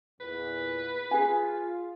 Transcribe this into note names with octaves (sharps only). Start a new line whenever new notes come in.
E2 A#2 B4
F4 G#4 G#5